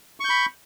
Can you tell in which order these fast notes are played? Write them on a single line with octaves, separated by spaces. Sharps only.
C#6 G6 B5